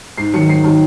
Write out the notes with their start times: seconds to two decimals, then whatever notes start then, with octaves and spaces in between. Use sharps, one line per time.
0.17 G#2 C7
0.34 D#3 F#3 C#7
0.49 G#2 C7
0.64 D#3 F#3